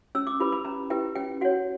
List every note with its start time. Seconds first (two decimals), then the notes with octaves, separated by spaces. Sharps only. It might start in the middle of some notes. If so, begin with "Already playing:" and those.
0.15 C#4 E6
0.27 D6
0.40 E4 G4 B4 B5
0.52 B5
0.65 C#4 A#5
0.90 E4 G4 B4 G5
1.16 C#4 G5
1.41 F#4 F#5
1.45 C#5